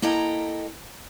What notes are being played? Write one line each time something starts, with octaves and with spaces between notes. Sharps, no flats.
A#3 E4 A4 D#5 G5 A#5